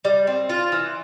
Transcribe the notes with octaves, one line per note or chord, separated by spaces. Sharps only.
G3
C4
F4
E3